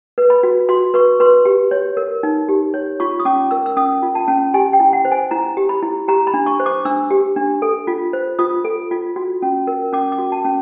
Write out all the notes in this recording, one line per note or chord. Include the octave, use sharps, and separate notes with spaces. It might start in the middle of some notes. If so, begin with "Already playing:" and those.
B4
B5
F#4
F#4 C6
B4 C#6
B4 C6
G4
C#5
A#4
D#4
G4
C#5
F4 C#6
D#6
C#4 D6
A#4 E6
E6
C#4 D#6
F4
A5
C#4
G4 G#5
G5
E4
F#5
C5
G#5
E4 A#5
G4
B5
E4
G4 A#5
B5
D4
C#6
C5
D6
D4 E6
G4
D4
A4
F4
C5
F4 D#6
A4
F4
F#4
C#4
A#4
C#4 D6
D6
F#4
A5
C#4